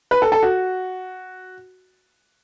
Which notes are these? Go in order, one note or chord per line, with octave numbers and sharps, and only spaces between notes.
B4
A4
A4
F#4